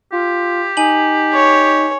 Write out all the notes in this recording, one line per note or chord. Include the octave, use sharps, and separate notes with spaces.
F4 G4
D#4 G#5 F#7
C#5